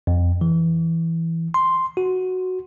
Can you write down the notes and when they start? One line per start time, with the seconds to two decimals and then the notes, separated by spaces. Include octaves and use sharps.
0.07 F2
0.41 E3
1.54 C6
1.97 F#4